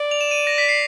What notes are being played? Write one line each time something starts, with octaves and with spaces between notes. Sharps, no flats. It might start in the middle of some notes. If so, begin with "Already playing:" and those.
Already playing: D5
F7
E7
D#7
A#6
B6
C7